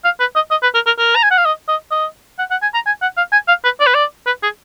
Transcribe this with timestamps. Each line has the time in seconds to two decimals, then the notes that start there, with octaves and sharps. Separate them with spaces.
0.04 F5
0.20 B4
0.35 D#5
0.51 D#5
0.63 B4
0.74 A#4
0.86 A#4
0.98 A#4
1.15 A#5
1.23 G#5
1.31 F#5
1.37 F5
1.45 D#5
1.68 D#5
1.91 D#5
2.38 F#5
2.51 F#5
2.62 G#5
2.74 A#5
2.86 G#5
3.02 F#5
3.17 F5
3.32 G#5
3.48 F5
3.64 B4
3.80 D5
3.86 B4
3.94 D5
4.26 B4
4.43 G#4